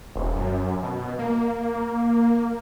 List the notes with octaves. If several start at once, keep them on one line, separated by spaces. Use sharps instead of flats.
E1
F#2
B2
A#3